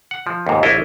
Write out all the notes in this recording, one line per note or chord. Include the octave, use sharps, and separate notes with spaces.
F#5
F3
D#2 G#2
A#1 E4 F4 C#5 D#5